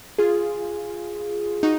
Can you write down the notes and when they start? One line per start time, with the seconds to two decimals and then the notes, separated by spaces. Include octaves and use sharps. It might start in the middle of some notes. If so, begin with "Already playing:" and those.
0.18 F4 G#4
1.63 D#4 F#4